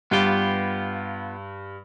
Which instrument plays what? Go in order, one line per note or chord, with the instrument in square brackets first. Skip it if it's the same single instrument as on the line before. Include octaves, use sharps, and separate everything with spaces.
[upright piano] G2 [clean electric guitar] B3 F4 G4